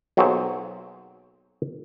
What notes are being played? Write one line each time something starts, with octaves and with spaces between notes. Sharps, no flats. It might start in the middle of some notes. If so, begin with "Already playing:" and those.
B1 F#3 A#3 C4 G#4 C5